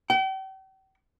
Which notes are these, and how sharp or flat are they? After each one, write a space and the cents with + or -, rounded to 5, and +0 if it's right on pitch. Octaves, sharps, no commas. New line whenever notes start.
G5 -40